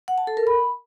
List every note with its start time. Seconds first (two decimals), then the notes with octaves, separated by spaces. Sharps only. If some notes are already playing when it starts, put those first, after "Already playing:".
0.08 F#5
0.18 A5
0.27 A4
0.37 A#4
0.47 B5